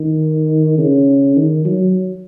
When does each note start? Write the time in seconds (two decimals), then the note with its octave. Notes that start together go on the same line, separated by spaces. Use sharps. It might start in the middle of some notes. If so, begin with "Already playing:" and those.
Already playing: D#3
0.78 C#3
1.36 D#3
1.65 F#3